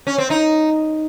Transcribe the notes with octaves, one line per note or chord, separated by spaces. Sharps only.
C#4
C4
D#4